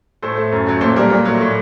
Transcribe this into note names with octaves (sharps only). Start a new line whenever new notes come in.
A2 A4 C5
A3
F#2
F#3 A3
A#2 A4 C5
G3 A#4 D5
A#2
F#3 A3
A2